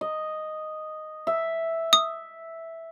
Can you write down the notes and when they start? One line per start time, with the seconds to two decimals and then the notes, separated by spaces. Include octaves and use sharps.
0.01 D#5
1.27 E5
1.93 D#6